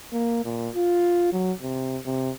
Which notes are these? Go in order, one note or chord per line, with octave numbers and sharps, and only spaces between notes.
A#3
A#2
F4
F#3
C3
C3